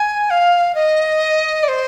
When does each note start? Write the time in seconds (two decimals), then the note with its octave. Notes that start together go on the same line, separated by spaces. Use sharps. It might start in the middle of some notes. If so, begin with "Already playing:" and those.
Already playing: G#5
0.30 F5
0.75 D#5
1.63 D5
1.68 C5